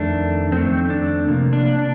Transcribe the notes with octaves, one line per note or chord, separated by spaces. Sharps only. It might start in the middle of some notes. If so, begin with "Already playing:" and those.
Already playing: F2 D#3 A3 D4
F2 D#3 A3 C4
D4
C3 F3 A#3
D4
D4